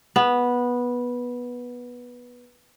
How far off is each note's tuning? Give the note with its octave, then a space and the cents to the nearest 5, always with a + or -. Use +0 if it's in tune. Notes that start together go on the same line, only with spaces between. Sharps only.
B3 -10